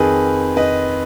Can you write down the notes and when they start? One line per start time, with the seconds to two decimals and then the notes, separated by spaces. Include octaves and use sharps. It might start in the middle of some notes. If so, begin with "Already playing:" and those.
Already playing: F2 D#3 G#4 B4
0.57 B4 D#5